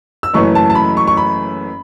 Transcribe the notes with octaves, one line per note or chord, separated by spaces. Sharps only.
E6
F#1 F#2 E3 A3 C#4 C#6
A5
A5
B5
C#6
C#6
B5